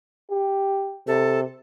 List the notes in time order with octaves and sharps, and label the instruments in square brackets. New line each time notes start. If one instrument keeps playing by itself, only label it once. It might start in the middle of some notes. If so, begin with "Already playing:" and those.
[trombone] G4
[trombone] C3 [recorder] A4